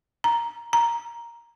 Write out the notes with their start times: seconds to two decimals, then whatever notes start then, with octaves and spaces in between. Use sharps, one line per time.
0.24 A#5
0.73 A#5